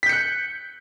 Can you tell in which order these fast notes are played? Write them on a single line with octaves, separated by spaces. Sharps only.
B6 G6 C#7 F#6